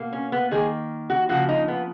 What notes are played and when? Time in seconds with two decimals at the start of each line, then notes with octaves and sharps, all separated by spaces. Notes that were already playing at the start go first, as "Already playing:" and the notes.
Already playing: B2 A#3
0.13 C#4
0.32 B3
0.51 D#3 A#3 G#4
1.10 F#4
1.29 C#3 F3 A#3 F#4
1.49 D#4
1.68 B3